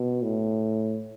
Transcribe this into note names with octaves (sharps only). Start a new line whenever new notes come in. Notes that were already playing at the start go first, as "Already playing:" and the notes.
Already playing: B2
A2